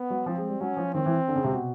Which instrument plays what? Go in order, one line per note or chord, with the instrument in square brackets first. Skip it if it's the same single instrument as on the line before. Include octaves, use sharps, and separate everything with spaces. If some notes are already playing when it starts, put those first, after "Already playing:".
Already playing: [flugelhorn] B3
[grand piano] F#3
[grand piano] F3 [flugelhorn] C4
[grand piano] G#3
G3
[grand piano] F#3 [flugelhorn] C#4
[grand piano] F3
[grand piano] D#3 [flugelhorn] C4
[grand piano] E3
D3
C#3
C3
B2